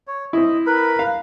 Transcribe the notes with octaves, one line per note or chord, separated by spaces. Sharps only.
C#5
C4 E4 D#5
A#4 B4 B5
F5